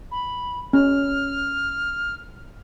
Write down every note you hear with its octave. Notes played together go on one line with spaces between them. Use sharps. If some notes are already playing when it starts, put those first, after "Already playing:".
B5
C#4 F6